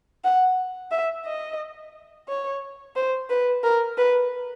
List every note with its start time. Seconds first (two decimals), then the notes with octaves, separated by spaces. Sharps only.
0.24 F#5
0.91 E5
1.26 D#5
2.28 C#5
2.96 C5
3.30 B4
3.64 A#4
3.98 B4